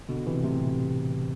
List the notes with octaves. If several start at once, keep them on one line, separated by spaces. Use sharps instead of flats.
B2 D3
C3 E3
A2 C3